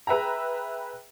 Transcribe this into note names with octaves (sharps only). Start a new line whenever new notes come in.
G#4 B4 E5 G5 A#5